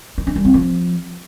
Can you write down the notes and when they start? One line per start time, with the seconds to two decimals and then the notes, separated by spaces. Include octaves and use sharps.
0.18 E4
0.27 D4
0.36 G3
0.45 C4
0.54 F3